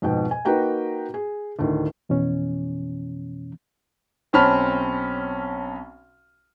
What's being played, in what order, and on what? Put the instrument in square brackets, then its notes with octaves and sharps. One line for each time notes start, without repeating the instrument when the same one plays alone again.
[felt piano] F2 G#2 B2 G5
G#5
A#3 D#4 F#4 B4 G5 A#5
G#4
D2 A2 D#3
[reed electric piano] F2 B2 E3 C#4
[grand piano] B1 C4 C#4 A5 B5 F6